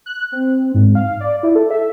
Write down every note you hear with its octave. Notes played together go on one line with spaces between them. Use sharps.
F#6
C4
G#2
F5
D5
E4
A4
E5